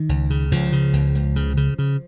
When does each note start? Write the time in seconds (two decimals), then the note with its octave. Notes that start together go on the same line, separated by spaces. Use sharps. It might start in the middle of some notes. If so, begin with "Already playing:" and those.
Already playing: D#3
0.09 C#2
0.30 C#3
0.52 C#2 F3
0.73 C#3
0.93 C#2
1.15 C#2
1.36 C#3
1.57 C#3
1.79 C#3